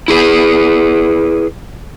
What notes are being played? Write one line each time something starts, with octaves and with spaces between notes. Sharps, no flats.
E4 G#4 B4